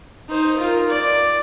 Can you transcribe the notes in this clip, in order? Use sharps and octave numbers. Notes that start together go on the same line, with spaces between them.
D#4 C5
F4 A#4
D5